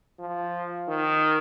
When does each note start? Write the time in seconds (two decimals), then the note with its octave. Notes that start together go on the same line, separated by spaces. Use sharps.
0.19 F3
0.88 D#3